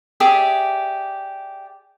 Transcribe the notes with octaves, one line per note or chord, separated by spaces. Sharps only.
G4 G#4 D5 E5